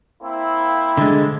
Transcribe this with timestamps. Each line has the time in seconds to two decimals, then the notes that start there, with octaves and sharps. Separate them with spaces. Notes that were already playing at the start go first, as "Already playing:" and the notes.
0.21 A#3 C4 E4
0.97 D3 G#3